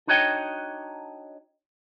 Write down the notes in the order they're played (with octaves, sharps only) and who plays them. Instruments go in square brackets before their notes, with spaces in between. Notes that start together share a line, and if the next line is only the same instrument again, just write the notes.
[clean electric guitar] D4 D#4 F#4 C#5 D#5 G5